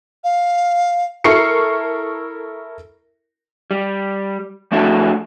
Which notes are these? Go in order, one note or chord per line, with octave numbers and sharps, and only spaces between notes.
F5
E4 A4 A#4 C#6 C7 C#7
G3
F3 A3 D4 E4 F#4 A4